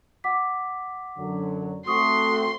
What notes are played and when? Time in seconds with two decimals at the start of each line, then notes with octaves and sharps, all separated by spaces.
0.24 F#5 D6 B6
1.18 F#2 D3 F#3
1.87 A3 C4 F#4 C6 C#6 D#6